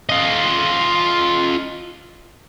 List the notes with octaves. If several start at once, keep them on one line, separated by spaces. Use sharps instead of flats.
F4 D#5